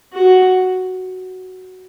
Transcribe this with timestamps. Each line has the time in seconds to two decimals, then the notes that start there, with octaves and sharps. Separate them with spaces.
0.13 F#4